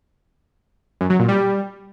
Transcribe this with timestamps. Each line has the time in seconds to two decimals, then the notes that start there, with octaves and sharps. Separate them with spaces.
1.01 F#2
1.10 F#3
1.19 A#2
1.29 G3